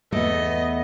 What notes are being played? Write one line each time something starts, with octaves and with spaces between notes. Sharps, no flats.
E2 A3 B3 D#5